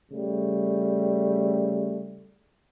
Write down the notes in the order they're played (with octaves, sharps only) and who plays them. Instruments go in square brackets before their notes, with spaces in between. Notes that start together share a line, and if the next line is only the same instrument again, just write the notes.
[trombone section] C#3 G3 A3